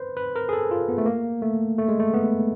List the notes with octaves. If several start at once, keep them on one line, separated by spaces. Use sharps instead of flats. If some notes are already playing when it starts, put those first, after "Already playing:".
Already playing: B4 C5
B4
A#4
G#4
A4
F4
B3
A3
A#3
A3
A3
G#3
A3
B3